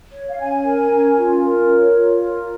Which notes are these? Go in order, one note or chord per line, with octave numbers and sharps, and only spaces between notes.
C#5
F5
C#4 G#5
A#4
C#4
F4
A#4
C#5
F4
A#4